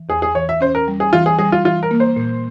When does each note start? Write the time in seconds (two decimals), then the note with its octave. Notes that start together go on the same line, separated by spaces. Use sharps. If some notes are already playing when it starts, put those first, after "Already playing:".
Already playing: E3
0.09 E2 G#4
0.22 G#4
0.35 E3 C#5
0.49 E5
0.61 C#4 C5
0.75 A#4
0.88 G3
1.00 G#4
1.13 E3 F4
1.26 G#4
1.39 G3 G#4
1.52 F4
1.65 E3 F4
1.83 A#4
1.91 A#3
2.00 C5
2.16 A#2